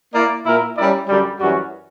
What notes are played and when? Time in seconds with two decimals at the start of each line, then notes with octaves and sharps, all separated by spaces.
0.13 A#3 E4 A#4 D5
0.45 A#2 A#3 E4 A#4
0.76 G3 C#4 E4 A#4 D5
1.08 F#2 D3 G3
1.40 F#2 E3 G3 C#4 F#4